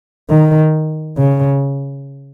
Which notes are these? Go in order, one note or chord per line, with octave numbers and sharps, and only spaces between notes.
D#3
C#3